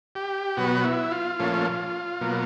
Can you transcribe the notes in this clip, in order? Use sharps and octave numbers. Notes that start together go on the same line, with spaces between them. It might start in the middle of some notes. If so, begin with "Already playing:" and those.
G4
B2 F#3 B3 F#4
E4
F4
A#2 F3 A3 C#4
B2 F#3 A#3